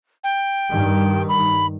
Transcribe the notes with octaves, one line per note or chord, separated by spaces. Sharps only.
G5
G2 D#3
B5